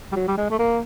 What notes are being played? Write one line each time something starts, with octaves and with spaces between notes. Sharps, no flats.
G3
F#3
G3
G#3
A3
A#3